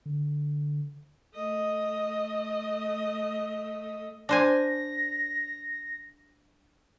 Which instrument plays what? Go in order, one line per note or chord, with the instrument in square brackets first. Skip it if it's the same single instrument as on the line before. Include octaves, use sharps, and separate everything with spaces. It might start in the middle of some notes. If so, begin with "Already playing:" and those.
[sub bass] D3
[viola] A3 D#5
[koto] D4 C5 G#5 [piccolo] A#6